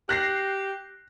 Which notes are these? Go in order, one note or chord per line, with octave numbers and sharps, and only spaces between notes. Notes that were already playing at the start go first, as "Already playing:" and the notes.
G4 F#6 A#6 C7